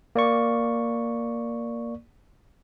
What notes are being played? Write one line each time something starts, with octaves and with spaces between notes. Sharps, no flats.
A#3 D5 C#6